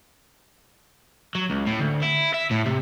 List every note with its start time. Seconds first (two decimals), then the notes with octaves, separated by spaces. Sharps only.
1.35 F#3
1.50 C#2
1.66 A2
1.79 D2
2.02 E4
2.34 E5
2.51 A2
2.66 C3